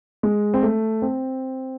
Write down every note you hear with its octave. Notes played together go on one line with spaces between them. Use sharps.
G#3
C4
A3
C4